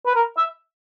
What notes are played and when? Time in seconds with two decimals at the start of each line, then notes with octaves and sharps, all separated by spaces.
0.06 B4
0.15 A#4
0.37 E5